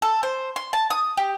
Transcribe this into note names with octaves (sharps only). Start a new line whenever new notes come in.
A4
C5
C6
A5
D#6
G4